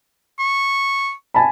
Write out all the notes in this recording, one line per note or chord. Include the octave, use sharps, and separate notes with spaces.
C#6
G#5 A5 B5